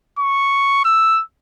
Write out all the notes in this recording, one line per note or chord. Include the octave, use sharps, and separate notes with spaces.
C#6
E6